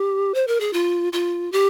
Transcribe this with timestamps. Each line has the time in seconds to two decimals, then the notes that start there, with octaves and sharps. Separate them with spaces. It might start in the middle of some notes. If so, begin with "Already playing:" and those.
Already playing: G4
0.34 C5
0.47 A#4
0.60 G#4
0.73 F4
1.13 F4
1.52 G4